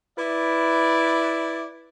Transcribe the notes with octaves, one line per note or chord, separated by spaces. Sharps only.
E4 B4 D5